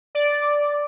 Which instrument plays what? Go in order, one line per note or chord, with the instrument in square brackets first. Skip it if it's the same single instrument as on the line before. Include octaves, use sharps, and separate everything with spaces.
[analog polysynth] D5